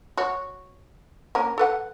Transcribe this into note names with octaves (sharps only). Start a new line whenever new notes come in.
F#4 C#5
A#3 C#4 A#4
A4 B4 F#5